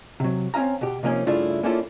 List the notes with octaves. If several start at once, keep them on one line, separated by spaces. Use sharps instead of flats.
C3 F#3
C4 C#4 D#4 F5 A#5
B2 G4
C3 F3 A#3 C#4 D#4
G2 C#3 A3 D4 E4 F4
A#3 C#4 D4 E4 F4 A4